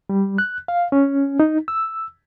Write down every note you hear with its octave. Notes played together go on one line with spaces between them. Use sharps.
G3
F#6
F5
C#4
D#4
E6